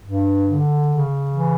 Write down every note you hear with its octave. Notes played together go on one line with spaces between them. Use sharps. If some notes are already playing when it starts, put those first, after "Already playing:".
G2
D3
C#3
E3